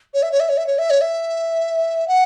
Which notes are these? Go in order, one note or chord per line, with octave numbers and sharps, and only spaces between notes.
C#5
E5
C#5
E5
C#5
E5
C#5
E5
C#5
E5
F#5